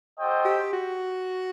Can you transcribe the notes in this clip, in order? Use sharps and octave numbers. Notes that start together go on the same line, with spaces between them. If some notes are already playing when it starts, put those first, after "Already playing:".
F#4 A4 C5 D#5 G5
G4
F#4